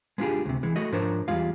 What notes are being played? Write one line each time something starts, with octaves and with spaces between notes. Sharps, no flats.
G#3 B3 D4 F4 G4 G#4
D2 C3
E3 G#3
A3 F#4 D#5
G#2 F3 D4 A#4 C5 C#5
E2 G3 G#3 F4 F5